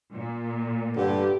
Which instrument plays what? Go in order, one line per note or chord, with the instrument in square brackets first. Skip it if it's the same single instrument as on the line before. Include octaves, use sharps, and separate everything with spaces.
[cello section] A#2
[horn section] G2 D3 [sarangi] G4